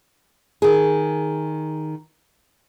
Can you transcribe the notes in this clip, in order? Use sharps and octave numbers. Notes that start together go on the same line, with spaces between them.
D#3 G#4